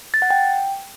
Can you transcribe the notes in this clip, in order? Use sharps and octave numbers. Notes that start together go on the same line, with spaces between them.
A6
F#5
G5